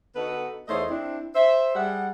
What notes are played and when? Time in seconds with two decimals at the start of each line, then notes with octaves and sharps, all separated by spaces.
0.16 D3 B3 D#4 F#4 A4 B4
0.68 E2 A3 D#4 C5 C#5 D#5
0.89 C4 D4 E4
1.35 C5 E5
1.75 G3 G#4 F#5